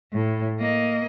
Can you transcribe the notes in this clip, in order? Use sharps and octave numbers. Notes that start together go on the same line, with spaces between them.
A2
A#3 D#5